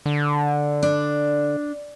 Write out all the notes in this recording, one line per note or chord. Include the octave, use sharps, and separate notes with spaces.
D3
D4